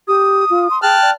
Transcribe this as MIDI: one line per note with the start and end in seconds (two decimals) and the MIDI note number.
0.08 0.45 67
0.08 0.82 87
0.50 0.68 65
0.71 0.82 84
0.82 0.97 68
0.82 1.11 79
0.82 1.10 81
0.82 1.10 89
0.82 1.10 90
1.02 1.14 74